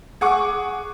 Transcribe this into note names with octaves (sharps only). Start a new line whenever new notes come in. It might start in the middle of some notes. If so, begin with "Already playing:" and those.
G#4 F#5 C#6 D6